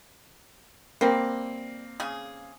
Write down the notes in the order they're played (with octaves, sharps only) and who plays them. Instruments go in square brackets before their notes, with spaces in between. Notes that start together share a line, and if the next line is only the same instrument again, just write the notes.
[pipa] G3 [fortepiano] A#3 C4
[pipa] C#3 G#4